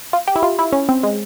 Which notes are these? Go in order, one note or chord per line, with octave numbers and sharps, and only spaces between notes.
F4
G4
E4
F4
E4
C#4
C4
G#3